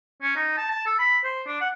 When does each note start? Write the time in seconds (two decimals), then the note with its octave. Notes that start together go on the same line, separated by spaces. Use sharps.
0.22 C#4
0.36 D#4
0.57 A5
0.71 A5
0.86 A4
0.99 B5
1.24 C5
1.47 D4
1.60 F#5